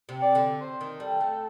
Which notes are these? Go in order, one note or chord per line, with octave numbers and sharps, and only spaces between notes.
C3
D5
D3
C5
D#3
G3 A4
A3